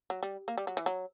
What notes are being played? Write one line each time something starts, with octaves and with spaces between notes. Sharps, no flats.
F#3
G3
A#3
G3
F#3
E3
F#3